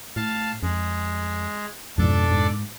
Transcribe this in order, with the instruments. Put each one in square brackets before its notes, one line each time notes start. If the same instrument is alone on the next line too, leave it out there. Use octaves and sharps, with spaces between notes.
[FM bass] A2 [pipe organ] F5 A5
[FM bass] F2 [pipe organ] G#3
[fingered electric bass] F2 B2 F3 [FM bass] G#2 [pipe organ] D4 A4 D5
[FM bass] G#2